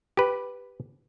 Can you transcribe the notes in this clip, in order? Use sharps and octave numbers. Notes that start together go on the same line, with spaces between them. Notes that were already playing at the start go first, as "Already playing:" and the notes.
G4 B4